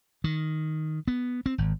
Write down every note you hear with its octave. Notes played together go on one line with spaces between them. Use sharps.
D#3
B3
C4
G#1